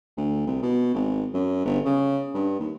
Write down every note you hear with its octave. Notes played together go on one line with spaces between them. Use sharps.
D2
C2
B2
G#1
F#2
G1
C#3
G2
D#2